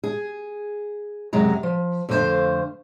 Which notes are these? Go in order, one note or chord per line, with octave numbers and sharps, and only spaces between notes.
G#4
F#2 C3 F#3 G#3 A#5
F3
F2 D3 A3 C4 C5 F5